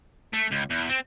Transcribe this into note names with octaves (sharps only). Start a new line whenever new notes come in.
A3
C#2
E2
C4